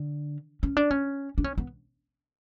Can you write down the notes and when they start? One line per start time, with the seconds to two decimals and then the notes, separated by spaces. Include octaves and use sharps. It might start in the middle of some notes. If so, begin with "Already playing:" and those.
Already playing: D3
0.63 C#4
0.77 D4
0.91 C#4
1.38 D4
1.44 C#4
1.58 B3